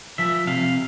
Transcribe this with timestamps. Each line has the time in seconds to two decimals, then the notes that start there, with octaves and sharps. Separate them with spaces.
0.18 F3 E5
0.47 C3 F5